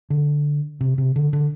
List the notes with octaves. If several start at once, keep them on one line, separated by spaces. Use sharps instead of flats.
D3
C3
C3
D3
D3